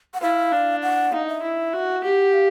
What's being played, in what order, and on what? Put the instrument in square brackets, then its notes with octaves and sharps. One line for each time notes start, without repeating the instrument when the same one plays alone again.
[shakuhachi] F#5
[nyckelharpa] E4 [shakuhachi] F5
[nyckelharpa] D4
[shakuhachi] F#5
[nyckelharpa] D#4 [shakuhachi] F5
[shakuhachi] E5
[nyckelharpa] E4
F#4
[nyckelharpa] G4 [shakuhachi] F#5
[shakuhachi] F5